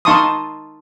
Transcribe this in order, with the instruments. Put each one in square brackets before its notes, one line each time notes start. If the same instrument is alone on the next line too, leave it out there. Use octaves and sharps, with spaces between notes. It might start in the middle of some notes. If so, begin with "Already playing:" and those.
[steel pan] D#4 F5 A5 C6 C#6 D#6